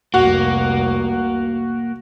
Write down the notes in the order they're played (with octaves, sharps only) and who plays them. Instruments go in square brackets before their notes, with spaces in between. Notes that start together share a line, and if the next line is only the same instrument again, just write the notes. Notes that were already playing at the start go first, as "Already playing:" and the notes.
[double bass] F1 C2 [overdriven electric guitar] A#3 [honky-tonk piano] F#4